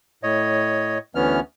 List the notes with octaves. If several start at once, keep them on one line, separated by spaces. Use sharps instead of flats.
A2 C#5 D#5
D2 E3 B3 C#4 F6